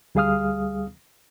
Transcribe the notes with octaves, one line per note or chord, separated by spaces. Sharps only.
D2 G3 G#4 F5 D#6 F6